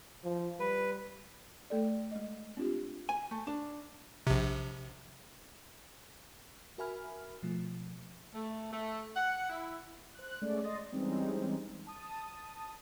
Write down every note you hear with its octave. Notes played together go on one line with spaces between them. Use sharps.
F3
G3 B4
A3 A4 D5
G#3 D#5
C4 D4 F4 G4
G#5
A3
D4
A#1 C3
F#4 A#4 E5 G#5 B5 F6
B2 F3 A3
A3
A3
F#5
E4
C5 F#6
G#3 A3 C#4 D5
D#5 C6 D#6 A6 A#6
D5
E3 G3 G#3 C4 C#4 D#4
A5 D#6